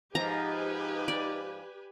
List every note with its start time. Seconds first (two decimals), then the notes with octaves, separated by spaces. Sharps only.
0.15 G#2 B2 F3 D#4 G4 B4 G#5 A#5
1.08 D5